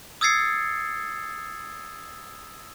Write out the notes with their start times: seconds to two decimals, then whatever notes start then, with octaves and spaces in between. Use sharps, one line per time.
0.21 D#6 E6 G#6 A6 C7 C#7